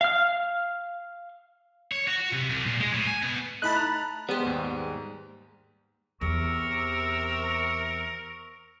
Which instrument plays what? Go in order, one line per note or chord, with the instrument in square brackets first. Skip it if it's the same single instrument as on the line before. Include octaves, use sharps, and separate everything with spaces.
[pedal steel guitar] F5 F6
[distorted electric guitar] C#5
F#4
F#4
C3
C2
A#2
G#3
A2
G#5
B2
[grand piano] A3 D#4 E4 [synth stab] A5 B5 F#6
[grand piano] A#5 F7
[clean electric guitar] G3 G#3 G4 [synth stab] B3 C5
[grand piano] D#2 G#2
[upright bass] E2 [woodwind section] C3 E6 [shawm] A#4 [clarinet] C#6